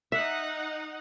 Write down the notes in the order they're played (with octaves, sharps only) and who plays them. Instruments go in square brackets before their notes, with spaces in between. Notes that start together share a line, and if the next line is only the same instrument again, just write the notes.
[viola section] D#4 F#5 [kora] E5